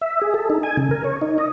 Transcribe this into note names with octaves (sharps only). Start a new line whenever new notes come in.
E5
G#4
A4
D#4
G#5
C#3
A#4
C#5
D#4
D#5